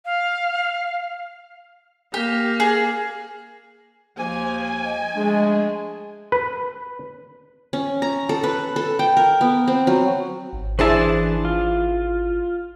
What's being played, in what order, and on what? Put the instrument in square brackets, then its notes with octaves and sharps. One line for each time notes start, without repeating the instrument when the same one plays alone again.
[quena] F5
[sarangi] A#3 [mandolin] G4
[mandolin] G#4
[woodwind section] D#2 F3 A#3 [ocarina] C5 [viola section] G#5
[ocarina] D#5
[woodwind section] F3 A3 D4 [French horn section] G#3
[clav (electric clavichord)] B4
[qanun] C#4
A#5
A4
B4
A4
G5
A#4
B3
C4
F#3
[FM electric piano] G#1
[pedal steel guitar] E3 D4 A5 [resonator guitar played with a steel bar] E4 G#4 C5
[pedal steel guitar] F4